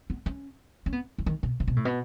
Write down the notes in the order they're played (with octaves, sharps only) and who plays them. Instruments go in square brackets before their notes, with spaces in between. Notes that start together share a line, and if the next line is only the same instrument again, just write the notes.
[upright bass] B3
C#4
C#4
B3
E3
D#3
B2
C#3
B2
A2
B2